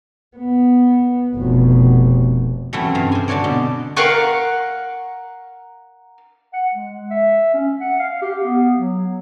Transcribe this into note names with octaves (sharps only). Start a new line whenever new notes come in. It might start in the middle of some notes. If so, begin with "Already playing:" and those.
B3
F1 B2
E3 F#3 A3 C4 C#4 E4
G2 C3 F5
C5 G#5
D3 D4 F#4 C#5 D5
B2
A#4 F5 F#5 C#6
F#5
G#3
E5
C#4
F#5
F5
G4
B3
F#3